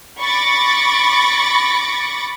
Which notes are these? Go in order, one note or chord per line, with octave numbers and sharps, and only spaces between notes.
B5 C#6 D6 A6 A#6